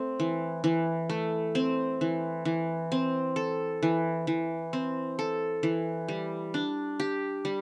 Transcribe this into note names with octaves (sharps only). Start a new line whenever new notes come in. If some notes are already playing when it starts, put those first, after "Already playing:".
Already playing: A3 C4
E3
E3
A3
C4
E3
E3
C4
A4
E3
E3
C4
A4
E3
G3
D4
G4
G3